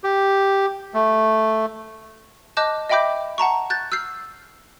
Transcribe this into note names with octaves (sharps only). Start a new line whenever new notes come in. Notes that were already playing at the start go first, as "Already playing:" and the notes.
G4
A3
D#5 A5 D6 F#6 G6 E7
D#5 E5 G5 B5 D6 G6
F#5 A5 A#5 C#6
F#6 G6 A6
E6 F6 G6 C7